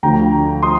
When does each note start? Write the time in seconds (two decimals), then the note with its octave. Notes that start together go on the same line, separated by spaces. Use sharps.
0.03 D2 D3 F3 G5 A#5
0.63 F3 C6 D#6